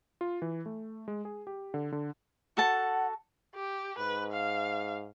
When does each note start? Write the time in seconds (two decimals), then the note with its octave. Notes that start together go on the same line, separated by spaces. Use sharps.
0.21 F4
0.42 E3
0.66 A3
1.08 G#3
1.25 G#4
1.47 G4
1.74 D3
1.92 D3
2.57 F#4 A4 F#5 A5
3.55 G4
3.98 G#2 B4
4.32 F5